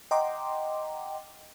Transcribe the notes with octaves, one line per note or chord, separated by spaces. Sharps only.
D#5 F#5 G5 A#5 C6 D6